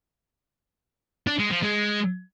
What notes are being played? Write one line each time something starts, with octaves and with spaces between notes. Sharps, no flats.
D4
G#3
F3
G#3